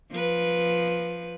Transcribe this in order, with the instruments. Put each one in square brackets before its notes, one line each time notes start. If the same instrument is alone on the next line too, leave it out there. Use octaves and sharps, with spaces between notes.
[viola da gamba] F3 B4